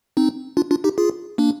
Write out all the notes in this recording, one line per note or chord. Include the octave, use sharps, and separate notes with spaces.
C4 D#4
D4 F4
D4 F4
D#4 G4
F4 G#4
A#3 D4